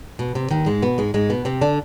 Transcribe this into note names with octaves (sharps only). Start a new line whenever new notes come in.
B2
C3
D#2 D#3
G#2 G#3
B2 B3
G#2 G#3
G#2 G#3
B2 B3
C3 C4
D3 D4